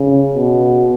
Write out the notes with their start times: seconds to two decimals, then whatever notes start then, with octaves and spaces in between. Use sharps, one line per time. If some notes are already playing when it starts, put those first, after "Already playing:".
Already playing: C#3
0.34 B2